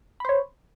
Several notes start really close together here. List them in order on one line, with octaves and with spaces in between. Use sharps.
B5 C5 C#5